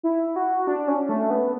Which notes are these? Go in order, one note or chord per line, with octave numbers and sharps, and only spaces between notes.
E4
F#4
D4
C#4
A3
B3